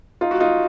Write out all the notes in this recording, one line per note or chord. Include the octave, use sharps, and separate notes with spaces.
D#4 F4
F#4
D#4 F4